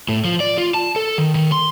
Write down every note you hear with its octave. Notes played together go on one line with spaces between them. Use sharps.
A2
F3
D5
F4
A5
A4
D#3
D#3
C6